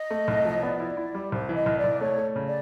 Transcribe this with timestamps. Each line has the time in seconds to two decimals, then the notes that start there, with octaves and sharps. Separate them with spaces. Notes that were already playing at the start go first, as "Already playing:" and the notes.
Already playing: D#5
0.11 A3
0.28 C2
0.45 F3
0.56 C#5
0.63 B3 D5
0.80 E4
0.97 E4
1.15 G3
1.32 C2 C5
1.49 E3
1.55 D#5
1.66 C2
1.78 D5
1.84 C2
2.01 A3 C#5
2.18 A3
2.36 C#3
2.47 D5